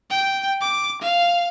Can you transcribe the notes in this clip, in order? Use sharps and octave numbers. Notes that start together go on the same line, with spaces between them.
G5
D6
F5